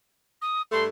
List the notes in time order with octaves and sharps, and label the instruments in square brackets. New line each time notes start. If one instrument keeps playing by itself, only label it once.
[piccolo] D#6
[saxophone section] G2 A3 [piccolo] C6